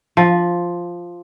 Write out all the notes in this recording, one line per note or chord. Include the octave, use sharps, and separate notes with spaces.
F3